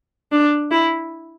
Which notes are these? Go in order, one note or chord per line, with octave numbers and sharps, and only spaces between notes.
D4
E4